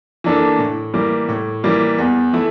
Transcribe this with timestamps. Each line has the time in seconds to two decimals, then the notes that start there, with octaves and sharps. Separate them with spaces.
0.24 E3 A#3 D4 A4
0.59 A2
0.94 E3 G3 A#3
1.28 A2
1.64 E3 G3 A#3
1.98 E2
2.33 E3 A3 E4